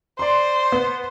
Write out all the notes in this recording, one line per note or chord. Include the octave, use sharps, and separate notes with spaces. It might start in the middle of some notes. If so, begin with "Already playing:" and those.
C5 D5 C6
B3